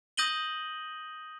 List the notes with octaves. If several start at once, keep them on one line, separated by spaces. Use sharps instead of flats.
D#6 G6 A#6 D#7 F#7 G7